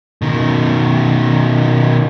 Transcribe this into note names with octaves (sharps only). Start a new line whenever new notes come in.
B2 D#3